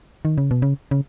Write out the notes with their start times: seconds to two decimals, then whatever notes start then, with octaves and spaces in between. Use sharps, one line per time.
0.25 D#3
0.38 C#3
0.51 B2
0.62 C#3
0.91 C#3